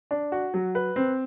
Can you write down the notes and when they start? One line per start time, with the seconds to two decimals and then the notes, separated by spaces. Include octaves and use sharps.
0.11 D4
0.32 F#4
0.54 F#3
0.75 B4
0.96 C4